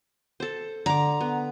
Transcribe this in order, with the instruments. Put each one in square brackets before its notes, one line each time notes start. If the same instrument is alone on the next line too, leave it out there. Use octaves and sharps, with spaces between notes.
[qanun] A4 C5
[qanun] D3 D6 [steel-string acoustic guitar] A#5
[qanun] B3